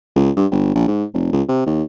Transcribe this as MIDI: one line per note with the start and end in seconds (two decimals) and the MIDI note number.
0.16 0.30 37
0.37 0.46 43
0.52 0.75 31
0.75 0.86 34
0.88 1.04 44
1.13 1.32 29
1.32 1.42 37
1.48 1.62 48
1.66 1.83 39